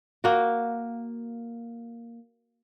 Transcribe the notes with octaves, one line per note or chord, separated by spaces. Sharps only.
A#3 F#4